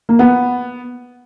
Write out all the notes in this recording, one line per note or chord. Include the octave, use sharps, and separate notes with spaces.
A#3
B3